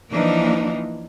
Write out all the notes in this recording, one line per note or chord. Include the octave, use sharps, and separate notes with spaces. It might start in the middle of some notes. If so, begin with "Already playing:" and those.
E3 F3 A#3 D4 D#4